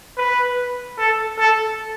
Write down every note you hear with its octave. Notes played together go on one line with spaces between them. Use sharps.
B4
A4
A4